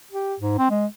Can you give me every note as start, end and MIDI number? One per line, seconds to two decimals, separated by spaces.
0.10 0.34 67
0.40 0.54 44
0.58 0.70 60
0.70 0.86 56